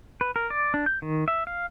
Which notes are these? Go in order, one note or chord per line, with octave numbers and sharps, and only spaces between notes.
B4
A#4
D5
D4
G6
D#3
E5
F5